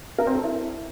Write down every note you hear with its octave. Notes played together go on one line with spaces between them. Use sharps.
A#4
C4
A4
E4